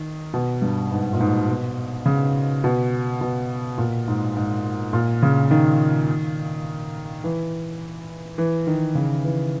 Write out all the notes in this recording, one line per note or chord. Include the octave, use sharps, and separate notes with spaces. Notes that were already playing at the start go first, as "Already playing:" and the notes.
Already playing: D#3
B2
G2
G#2
A#2
G#2
B2
C#3
B2
B2
A#2
G#2
G#2
A#2
C#3
D#3
E3
E3
D#3
C#3
E3